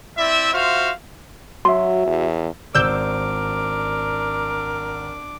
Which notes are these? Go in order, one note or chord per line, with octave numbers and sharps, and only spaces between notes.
C4 E4 D5 E5
F4 F#4 C5 E5 F5
F#3 F#4 E5 C6
E2
G#1 D4 A#4 C5 D5 D6 E6 G6